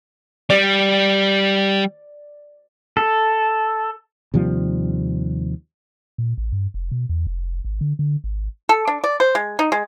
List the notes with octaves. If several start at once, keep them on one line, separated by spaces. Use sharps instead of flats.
G3 D5
A4
D#2 C3 F3 G3
A#2
A1
G2
F1
B2
E2
F1
G#1
D3
D3
G#1
A4
D4
D5
C5
G#3
D#4
G#3